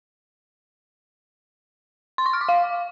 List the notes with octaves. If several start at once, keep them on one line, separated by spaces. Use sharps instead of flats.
C6
C#6
F6
D6
F5